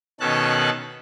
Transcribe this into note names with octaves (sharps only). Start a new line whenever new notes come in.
B2 D#3 C#4 A4 A5 F#6